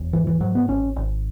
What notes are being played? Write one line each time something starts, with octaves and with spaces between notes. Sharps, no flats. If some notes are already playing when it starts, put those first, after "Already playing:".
Already playing: E1
G#2 E3
E3
G#2 F#3
B3
G#1 C#4
G#1